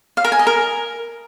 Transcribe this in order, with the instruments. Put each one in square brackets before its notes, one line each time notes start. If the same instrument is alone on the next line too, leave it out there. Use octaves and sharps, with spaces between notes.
[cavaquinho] F5
A#4
G#5
D#5
A#4